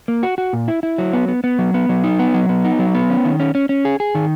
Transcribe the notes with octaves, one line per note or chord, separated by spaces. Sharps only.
A#3
F#4
F#4
A#2
E4
E4
F#3
B3
B3
B3
F#3
B3
F#3
D#4
B3
F#3
B3
D#4
F#3
B3
C#4
D#3
C#4
C#4
C#4
G#4
G#4
D#3